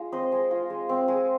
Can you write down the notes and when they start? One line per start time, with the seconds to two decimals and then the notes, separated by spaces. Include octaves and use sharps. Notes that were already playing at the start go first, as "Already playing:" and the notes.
Already playing: G#3 F4
0.12 C4 C5 D#5
0.32 G#3
0.51 F4
0.70 G#3
0.89 C4
1.08 G#3